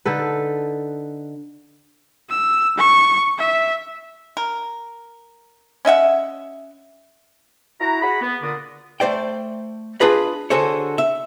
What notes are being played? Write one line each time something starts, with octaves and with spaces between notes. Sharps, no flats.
D3 D#4 A4 B4
E6
C#6
E5
A#4
C#4 D#5 E5 F#5
E4 F#4 F#5 A#5
F#4 G#4 B5
B3
A#2 D3 A#3 D4 D#6
A3 C5 D5 G5
D4 F4 G#4 B4 D#5
D3 F#4 G#4 A4 C5 C#5
E5